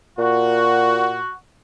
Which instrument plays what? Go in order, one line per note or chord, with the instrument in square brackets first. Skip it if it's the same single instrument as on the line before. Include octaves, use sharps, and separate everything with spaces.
[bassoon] A#2 [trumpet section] F#4